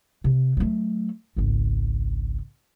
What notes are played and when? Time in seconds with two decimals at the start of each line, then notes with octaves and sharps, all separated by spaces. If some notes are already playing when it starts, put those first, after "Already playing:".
0.24 C3
0.57 F#3 A3
1.36 G#1 C#2